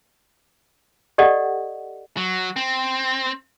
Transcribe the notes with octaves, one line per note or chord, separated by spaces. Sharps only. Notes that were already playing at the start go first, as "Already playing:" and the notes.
G4 A4 D5 D#5 F#5
F#3
C4